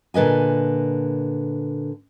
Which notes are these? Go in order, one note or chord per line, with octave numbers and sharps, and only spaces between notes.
A#2 D3 B4 D#5 G#5